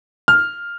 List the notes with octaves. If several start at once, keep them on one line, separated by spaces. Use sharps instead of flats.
F6